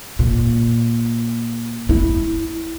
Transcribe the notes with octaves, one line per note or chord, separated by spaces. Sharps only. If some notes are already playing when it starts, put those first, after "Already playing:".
A#2
E4